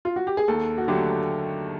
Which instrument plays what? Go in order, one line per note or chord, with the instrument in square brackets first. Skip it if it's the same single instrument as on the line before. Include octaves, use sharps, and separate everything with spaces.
[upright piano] F4
F#4
G4
G#4
[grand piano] D#2 [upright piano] A4
[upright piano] F#4
[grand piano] D3 F#3 A3 [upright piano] G4